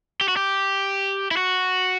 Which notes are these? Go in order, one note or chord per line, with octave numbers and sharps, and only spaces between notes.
G4
F#4
G4
E4
F#4